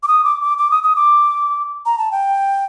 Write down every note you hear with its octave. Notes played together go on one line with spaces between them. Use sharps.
D6
D#6
D6
D6
D6
D#6
D#6
D6
A#5
A5
G5